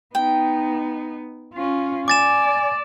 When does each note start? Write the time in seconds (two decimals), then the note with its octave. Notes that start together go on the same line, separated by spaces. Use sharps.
0.15 B3 D#4 G5
1.53 C#4 F4
2.08 D5 G#5 D6 A6 E7